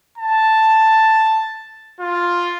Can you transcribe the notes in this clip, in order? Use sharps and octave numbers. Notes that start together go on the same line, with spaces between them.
A5
F4